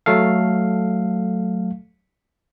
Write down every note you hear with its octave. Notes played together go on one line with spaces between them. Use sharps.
F#3 A3 A4 F5